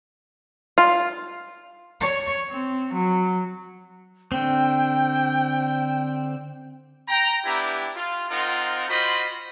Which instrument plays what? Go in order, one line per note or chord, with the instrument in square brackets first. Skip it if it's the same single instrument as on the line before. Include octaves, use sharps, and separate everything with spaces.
[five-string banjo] F4
[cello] C#5
C4
F#3
[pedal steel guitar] D3 C4 [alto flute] G5
[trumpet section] G5 A#5
B3 D4 E4 G4
F4
C4 D#4 F4 A#4 F#5
F4 F#4 C5 D#5 B5